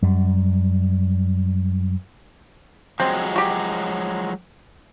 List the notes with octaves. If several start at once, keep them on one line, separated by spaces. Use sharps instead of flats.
F#2 G3
F3 F#3 G#3 C4
F#4 G4